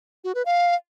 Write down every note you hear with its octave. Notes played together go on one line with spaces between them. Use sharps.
F#4
B4
F5